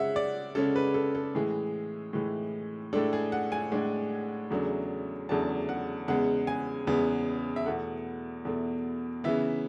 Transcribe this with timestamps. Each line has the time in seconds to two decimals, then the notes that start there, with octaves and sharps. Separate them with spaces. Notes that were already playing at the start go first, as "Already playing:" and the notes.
Already playing: C#3 G#3 C#4 E5 F#5
0.16 D5
0.55 C#3 G#3 C#4 A4
0.76 B4
0.94 A4
1.15 A4
1.35 A2 E3 G#3 G#4
2.13 A2 E3 G#3
2.93 A2 G#3 D4 A4
3.13 G#4
3.32 F#5
3.52 G#5
3.72 A2 G#3 D4
4.51 E2 C#3 F#3 A3 D4
5.29 E2 C#3 F#3 A3 D4 A5
5.69 F#5
6.08 E2 C#3 G#3 B3 F#5
6.47 G#5
6.87 E2 C#3 G#3 B3
7.56 E5
7.66 E2 B2 A3 F#5
8.45 E2 B2 A3
9.24 C#3 E3 B3 E5